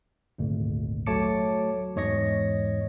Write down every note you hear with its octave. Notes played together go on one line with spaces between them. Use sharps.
G#1 D2 A#2
F#3 A3 C#5 A5 D6 C#7
E2 G#2 C#5 D#5 C#6 A#6